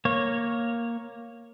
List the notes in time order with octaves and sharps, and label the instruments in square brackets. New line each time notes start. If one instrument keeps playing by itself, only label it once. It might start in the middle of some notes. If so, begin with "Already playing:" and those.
[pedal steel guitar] A#3 C#5